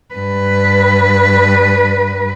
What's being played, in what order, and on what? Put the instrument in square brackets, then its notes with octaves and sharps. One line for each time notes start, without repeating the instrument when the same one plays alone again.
[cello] G2 B4